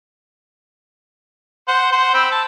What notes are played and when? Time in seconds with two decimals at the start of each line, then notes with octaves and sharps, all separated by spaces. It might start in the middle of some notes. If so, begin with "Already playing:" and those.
1.68 C5 F#5
1.92 C5 F#5
2.14 C4 B5 E6
2.32 A5